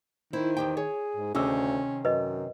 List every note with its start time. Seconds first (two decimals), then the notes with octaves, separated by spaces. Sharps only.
0.33 D#3 E4 C5
0.57 E2 G4 G5
0.77 G#4 C#5
1.17 G#2
1.35 D2 C3 D#3 C4 C#4 G#4 E6
2.05 F#2 B4 D#5